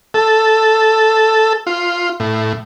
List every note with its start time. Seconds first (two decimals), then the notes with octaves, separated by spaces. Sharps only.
0.14 A4
1.67 F4
2.20 A2